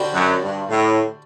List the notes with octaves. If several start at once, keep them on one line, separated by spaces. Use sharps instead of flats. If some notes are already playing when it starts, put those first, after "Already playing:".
Already playing: D3 G3 C4 F#4
F#2
G2
A2